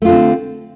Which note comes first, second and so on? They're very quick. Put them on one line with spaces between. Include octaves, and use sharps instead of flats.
A3 F4 D3 C4